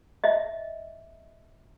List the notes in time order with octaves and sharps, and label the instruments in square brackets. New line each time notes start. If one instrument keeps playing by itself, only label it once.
[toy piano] D#5 E5